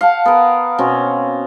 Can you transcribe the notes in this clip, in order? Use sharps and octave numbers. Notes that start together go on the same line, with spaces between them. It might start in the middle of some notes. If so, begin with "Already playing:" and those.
F5 F#5 A5
B3 A#4
B2 C4 C#4